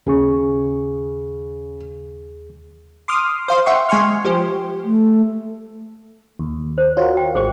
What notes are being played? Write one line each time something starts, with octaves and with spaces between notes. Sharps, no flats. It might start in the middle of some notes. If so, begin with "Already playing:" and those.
D#2 C#3 G#4 C#6
C6 D6 D#6 F6
C5 F5 C6
E5 F#5 G5 C6 C#6
G#3 G#5 C6 C#6 F6
F3 G4 C5
A3
D#2
C5
F4 F#4 A#4 C#5
G5
A1 G#3 G#4 C5 C#6